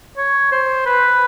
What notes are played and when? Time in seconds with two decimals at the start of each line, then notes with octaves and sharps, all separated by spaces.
0.17 C#5
0.52 C5
0.86 B4